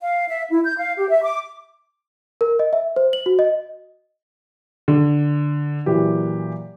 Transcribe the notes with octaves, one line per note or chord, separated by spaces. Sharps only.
F5
E5
E4
G6
F5
G4
E5
D6
A#4
D#5
E5
C5
F#7
F#4
D#5
D3
A#2 E3 F#3 G4